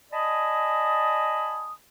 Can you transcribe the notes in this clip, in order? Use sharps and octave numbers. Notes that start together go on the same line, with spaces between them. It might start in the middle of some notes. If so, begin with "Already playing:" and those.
D5 D#5 G#5 A5 B5 D#6